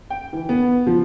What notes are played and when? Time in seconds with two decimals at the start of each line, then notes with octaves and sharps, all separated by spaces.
0.10 G5
0.33 E3
0.49 B3
0.87 F3